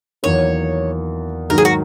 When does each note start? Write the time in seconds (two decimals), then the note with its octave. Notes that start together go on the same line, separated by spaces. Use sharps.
0.23 E2 D#3 F#3 A#3 C#5
1.50 G#2 D#3 F#3 A#4
1.58 G#4
1.65 F#4